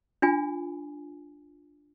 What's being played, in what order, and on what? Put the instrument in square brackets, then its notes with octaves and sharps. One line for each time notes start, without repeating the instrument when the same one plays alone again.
[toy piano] D4 F4 G#5